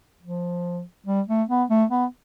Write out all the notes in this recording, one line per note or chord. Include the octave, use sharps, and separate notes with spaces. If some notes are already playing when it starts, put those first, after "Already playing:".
F3
G3
A3
B3
A3
B3